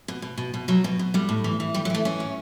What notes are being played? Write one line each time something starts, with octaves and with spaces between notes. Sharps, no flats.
B2
B2
B2
B2
B2 F#3
B2
B2
A2 G3
A2
E3
E3
A2 G3
F#3
E3 A3
E3 C#4
A2